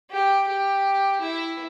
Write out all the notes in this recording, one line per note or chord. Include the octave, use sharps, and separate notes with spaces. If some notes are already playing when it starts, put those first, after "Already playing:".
G4
G4
E4